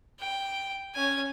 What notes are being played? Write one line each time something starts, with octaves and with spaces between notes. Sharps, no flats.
G5
C#4 G#5